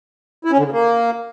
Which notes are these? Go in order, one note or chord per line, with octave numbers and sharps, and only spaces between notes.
E4
C#4
D3
C#3
A#3